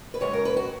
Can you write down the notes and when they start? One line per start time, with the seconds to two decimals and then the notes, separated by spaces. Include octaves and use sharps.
0.14 B4
0.21 F#2 C#3 G#3 C#5
0.33 A#4
0.45 B4
0.57 F#4